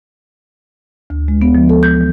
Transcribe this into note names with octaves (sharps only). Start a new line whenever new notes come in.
D2
G#3
B3
F3
A4
G6
E3